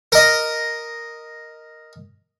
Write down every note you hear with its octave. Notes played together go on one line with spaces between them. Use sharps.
A#4 D#5